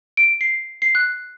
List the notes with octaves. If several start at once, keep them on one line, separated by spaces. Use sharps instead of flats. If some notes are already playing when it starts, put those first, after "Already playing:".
D7
C7
C7
F#6